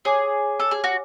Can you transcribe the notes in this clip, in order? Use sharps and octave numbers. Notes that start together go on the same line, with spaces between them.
G#4 C#5 G#5 D6
A4
G#4
F#4